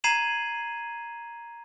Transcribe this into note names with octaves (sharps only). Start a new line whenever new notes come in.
A#5 G#6 C7 D#7 E7 F#7